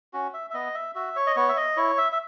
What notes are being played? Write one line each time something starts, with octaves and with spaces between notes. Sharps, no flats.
C#4 F#4
E5
E5
B3 D#5
E5
F#4 E5
C#5
D#5
B3 C#5
E5
D#5
E4 C#5
E5
E5